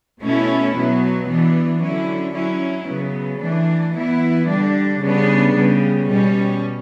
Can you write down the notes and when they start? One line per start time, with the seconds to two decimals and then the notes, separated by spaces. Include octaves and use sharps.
0.22 B2 A3 C#4 E4
0.75 B2 F#3 B3
1.29 E3 B3 D4
1.82 D3 F#3 C#4 E4
2.35 F#3 C#4 E4
2.89 C#3 F#3 B3
3.42 E3 A3 D4
3.95 E3 B3 E4
4.49 D3 G3 D4
5.02 C#3 G3 B3 D4
5.55 C#3 G3 B3
6.09 B2 G3 C#4